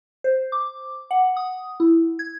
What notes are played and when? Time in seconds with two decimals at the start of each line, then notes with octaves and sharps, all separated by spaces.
0.24 C5
0.52 D6
1.11 F#5
1.37 D#6
1.80 E4
2.19 G#6